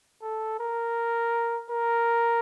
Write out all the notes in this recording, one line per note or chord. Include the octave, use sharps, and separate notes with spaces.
A4
A#4
A#4